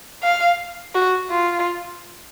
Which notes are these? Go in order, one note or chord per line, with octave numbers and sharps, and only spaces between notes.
F5
F#4
F4